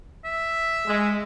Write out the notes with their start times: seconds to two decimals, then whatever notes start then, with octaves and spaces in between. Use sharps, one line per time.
0.25 E5
0.87 G#3